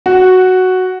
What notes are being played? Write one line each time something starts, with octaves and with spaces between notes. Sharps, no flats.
F#4